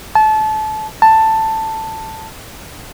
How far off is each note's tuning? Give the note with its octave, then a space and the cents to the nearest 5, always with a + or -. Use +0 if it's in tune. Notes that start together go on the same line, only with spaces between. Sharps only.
A5 -25
A5 +10